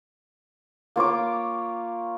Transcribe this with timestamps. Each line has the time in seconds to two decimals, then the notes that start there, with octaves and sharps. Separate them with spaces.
0.96 A#3 F4 C#5 D6